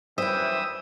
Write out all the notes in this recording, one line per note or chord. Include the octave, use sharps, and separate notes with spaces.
F#2 E3 G3 E4 C5 E5 D#6